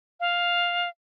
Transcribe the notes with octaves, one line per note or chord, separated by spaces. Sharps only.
F5